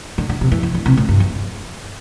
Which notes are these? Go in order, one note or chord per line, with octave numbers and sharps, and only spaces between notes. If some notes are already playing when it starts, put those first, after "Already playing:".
D3
D3
C3
E3
E3
D3
C3
A2
G2
E2